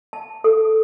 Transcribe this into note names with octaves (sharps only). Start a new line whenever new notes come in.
A5
A4